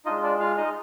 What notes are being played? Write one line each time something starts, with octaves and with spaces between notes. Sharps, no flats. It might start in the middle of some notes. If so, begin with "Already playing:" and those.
G#3 D4 D#4 F4 D#5
D4 D5
F4 F5
D#4 D#5